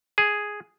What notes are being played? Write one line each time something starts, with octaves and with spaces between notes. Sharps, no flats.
G#4